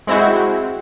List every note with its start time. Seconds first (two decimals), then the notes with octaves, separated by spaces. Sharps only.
0.07 G#3 C4 E4 F#4